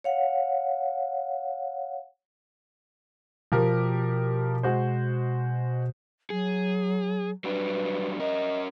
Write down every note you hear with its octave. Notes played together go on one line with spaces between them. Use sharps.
C#5 F5 F#5
B2 F3 G4 A#4
G#3 F#4 C5
F#3 G#4
F#3 G3 D4 B4
C#4 A#4 D#5